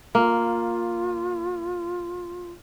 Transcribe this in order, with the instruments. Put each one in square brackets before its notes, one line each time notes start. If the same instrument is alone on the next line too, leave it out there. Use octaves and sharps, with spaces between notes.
[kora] A#3 [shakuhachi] F4